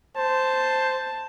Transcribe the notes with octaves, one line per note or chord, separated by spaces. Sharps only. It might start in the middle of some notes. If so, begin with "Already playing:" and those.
C5 A5